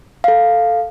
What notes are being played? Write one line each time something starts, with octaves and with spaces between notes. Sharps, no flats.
A4 F5